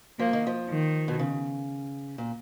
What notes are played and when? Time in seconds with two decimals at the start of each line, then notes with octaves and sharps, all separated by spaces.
0.19 F3 A#3
0.33 D#3
0.47 F3
0.69 D#3
1.08 B2
1.19 C#3
2.18 A#2